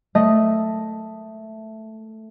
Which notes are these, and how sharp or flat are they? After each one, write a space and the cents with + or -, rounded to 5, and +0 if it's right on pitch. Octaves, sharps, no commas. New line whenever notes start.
A3 +0 D#5 +0